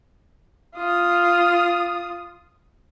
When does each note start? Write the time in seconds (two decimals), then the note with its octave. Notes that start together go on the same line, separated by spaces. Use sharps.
0.76 F4 D#6